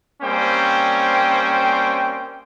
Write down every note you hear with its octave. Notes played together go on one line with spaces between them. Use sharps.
G3 A#3 C4 C#4 C5 G5